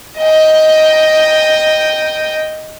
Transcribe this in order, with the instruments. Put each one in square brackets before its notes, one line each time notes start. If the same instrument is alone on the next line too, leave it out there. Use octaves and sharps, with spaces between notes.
[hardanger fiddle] D#5 G5